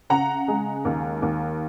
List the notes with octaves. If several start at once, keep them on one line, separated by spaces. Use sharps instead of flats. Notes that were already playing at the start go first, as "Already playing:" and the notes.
C#3 F#5 A#5
G#3
D#2
D#2